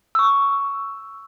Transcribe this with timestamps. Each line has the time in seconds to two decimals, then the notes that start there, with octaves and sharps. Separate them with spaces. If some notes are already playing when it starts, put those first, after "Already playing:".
0.15 C#6 E6